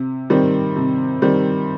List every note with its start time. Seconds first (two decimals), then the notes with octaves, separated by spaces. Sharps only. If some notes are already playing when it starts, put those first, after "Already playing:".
Already playing: C3
0.30 D#3 G3 C4
0.76 C3
1.22 D#3 G3 C4